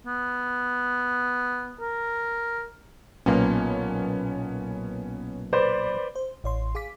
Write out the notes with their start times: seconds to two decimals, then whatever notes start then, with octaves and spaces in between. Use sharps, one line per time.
0.06 B3
1.80 A#4
3.26 B1 A#2 A#3 B3 C#4
5.53 B4 C5 D5
6.15 C5
6.44 A1 C#5 C6
6.75 G#4 F5 D6 B6